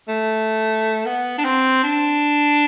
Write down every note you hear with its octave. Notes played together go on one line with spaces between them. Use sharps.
A3
B3
D4
C4
D4